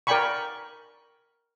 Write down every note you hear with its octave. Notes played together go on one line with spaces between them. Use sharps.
A#4 D5 G5 G#5 B5 C#6